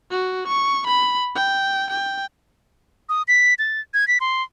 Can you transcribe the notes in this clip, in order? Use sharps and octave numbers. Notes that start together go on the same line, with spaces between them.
F#4
C#6
B5
G5
G5
D#6
B6
A6
G#6
B6
C6